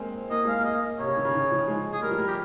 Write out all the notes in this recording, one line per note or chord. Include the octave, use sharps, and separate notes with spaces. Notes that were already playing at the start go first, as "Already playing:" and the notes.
Already playing: G#3 A#3 C4
A#3 D#5
G#3 F5
A#3
D#5
C3 C#5
C#3
D#3
C#3
D#3
F3
G#3
G#4
G3 A#4
F3
G3
G4